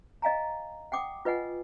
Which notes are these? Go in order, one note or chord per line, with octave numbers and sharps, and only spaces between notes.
D#5 F5 G#5 A#5
F#5 G5 D6 D#6
F4 B4 D#5 F#5 G#5